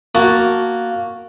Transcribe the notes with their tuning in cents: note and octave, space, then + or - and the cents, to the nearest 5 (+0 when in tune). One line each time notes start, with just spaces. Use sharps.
A#3 +0 F#4 +0 A5 +0